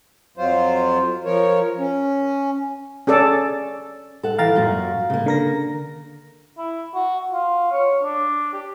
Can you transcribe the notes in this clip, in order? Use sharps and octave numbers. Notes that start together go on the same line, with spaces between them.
F2 F#3 F4 C5
F3 A#4 C#5
C#4
C#4 G#4 A4 D5
A4 F#5
E3 F5 G5 A#5 A6
F#2 A#2 F#4
C#3 A#3
D3 A#4 A#6
E4
F#4
F4
C#5
D4
G4